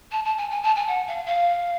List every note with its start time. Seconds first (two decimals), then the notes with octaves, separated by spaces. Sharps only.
0.12 A5
0.25 A5
0.37 G#5
0.51 G#5
0.63 A5
0.76 G#5
0.88 F#5
1.07 F5
1.26 F5